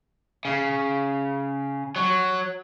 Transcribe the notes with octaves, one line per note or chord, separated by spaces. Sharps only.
C#3
F#3